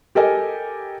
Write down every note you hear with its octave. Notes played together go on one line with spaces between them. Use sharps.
G4 A4 A#4 D#5 G#5